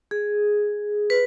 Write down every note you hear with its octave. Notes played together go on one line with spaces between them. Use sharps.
G#4
B4